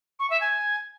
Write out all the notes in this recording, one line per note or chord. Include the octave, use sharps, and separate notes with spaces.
C#6
E5
G#5